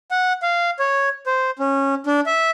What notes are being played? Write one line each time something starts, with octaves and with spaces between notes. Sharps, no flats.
F#5
F5
C#5
C5
C#4
D4
E5